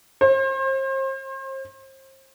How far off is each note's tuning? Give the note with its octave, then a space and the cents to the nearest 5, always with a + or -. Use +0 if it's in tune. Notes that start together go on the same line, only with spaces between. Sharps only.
C5 +35